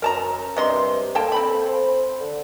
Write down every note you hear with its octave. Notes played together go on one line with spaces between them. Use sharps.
F#2 A#4 A5 A#5
G2 C3 D#5 C6
A#3 A4 G5 A5
C4 B5
C5
D3